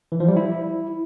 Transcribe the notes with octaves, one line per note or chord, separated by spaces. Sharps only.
E3
F3
G3
E4